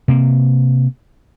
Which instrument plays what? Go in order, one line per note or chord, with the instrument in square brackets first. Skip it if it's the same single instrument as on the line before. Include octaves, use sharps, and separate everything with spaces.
[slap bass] C3 A#3